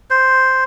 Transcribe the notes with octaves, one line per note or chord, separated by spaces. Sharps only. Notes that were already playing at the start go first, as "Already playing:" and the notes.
C5